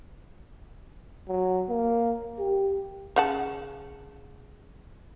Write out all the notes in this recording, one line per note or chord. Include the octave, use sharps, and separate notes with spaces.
F#3
A#3
G4
C#3 F#5 A5